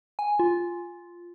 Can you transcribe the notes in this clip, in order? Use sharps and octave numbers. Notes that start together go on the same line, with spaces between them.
G#5
F4